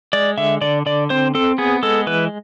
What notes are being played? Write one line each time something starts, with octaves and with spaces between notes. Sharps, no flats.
G#3 D5
D3 E5
D3 D5
D3 D5
C4 C5
C4 A4
B3 G#4
G#3 A4
E3 B4